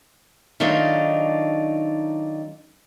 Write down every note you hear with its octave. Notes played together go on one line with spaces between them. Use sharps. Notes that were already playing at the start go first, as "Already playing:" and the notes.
D#3 F#3 A3 D4 D#4 F4